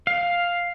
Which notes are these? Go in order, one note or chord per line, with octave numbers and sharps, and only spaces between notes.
F5